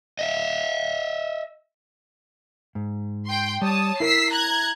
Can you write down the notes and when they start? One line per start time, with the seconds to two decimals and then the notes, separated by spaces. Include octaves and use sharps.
0.19 D#5 E5
2.75 G#2
3.27 G5 C6
3.62 G3 C#5 A5 D#6
4.00 E4 A#4 E5 E6 B6 C7
4.32 A#5 F#6 G#6